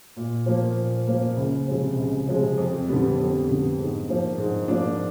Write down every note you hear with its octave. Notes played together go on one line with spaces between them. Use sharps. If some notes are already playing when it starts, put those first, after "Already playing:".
A#2
F3 A#3
A#2
F3 A#3
C#2
C3 F3 G#3 C4
C#2
C3 F3 G#3 C4
F2
D3 G3 B3
F2
D3 G3 B3
G#2
F3 A#3 D4
G#2
F3 A#3 D4